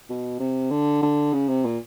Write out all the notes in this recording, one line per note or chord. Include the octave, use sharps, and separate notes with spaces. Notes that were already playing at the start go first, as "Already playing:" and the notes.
B2
C3
D3
D3
C#3
C3
A#2